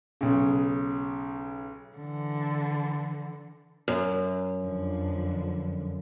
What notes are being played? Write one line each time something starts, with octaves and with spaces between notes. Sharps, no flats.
B1 C#3
D3 E3
F#2
F2 D3 F3